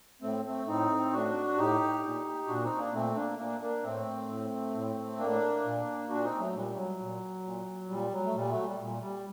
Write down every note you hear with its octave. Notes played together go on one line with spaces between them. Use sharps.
A2 A3 C4
A3 C4
A2 C4 D#4
A2 D4 F#4
A2 D#4 G4
A#2
A#2 D4 F#4
C4 D#4
A#3 D4
A#2 A3 C4
A#3 D4
A#2 A#3 D4
A#3 D4
A2 A3 C4
A2
A2
A2 A#3 D4
A#2
A#2 D4 F#4
C4 D#4
F#3 A3
A#2 G3
F#3
A#2
A#2
A#2 G3
F#3
A3
A#2 G3
F#3 A3
G3
A#2
G3